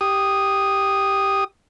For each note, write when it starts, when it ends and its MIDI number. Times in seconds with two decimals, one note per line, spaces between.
0.01 1.44 67
0.01 1.44 87